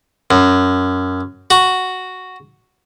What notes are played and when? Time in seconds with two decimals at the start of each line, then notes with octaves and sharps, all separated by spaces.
0.31 F#2
1.50 F#4